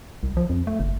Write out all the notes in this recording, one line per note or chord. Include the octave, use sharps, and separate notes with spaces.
C2
F3
F2
A3
F#1